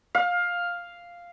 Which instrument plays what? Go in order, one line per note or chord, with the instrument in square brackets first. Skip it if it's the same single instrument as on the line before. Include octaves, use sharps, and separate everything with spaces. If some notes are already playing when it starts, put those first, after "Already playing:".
[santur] F5